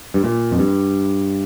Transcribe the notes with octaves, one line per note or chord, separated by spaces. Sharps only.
G2
A#2
F2
G2